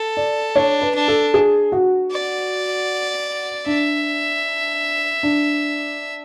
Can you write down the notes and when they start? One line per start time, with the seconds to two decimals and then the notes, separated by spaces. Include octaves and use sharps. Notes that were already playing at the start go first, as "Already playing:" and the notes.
Already playing: A4
0.17 D5
0.56 D4 C#5
0.82 B4
0.95 D4
1.08 A4
1.34 G#4
1.72 F#4
2.11 D5
3.66 D4 E5
5.23 D4